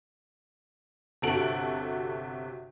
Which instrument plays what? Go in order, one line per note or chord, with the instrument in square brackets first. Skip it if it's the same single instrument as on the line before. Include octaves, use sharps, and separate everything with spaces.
[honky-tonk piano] G1 C3 F#4 A4 D7 F#7